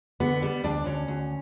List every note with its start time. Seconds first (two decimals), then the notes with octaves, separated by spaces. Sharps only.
0.20 D3 B3
0.42 G3 B3
0.64 D2 D4
0.86 D2 C#4
1.08 D2